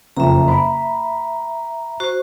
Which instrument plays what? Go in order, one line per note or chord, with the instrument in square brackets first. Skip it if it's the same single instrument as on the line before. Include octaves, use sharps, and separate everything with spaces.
[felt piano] F#1 F2 [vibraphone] E5 A#5
[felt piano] B5
[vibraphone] F#4 C5 C#6